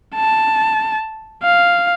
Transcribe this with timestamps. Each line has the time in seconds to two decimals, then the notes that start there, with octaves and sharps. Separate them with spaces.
0.16 A5
1.43 F5